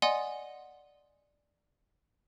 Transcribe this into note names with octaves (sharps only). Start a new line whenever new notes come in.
D5 D#5 F#5 G#5 C6 D#6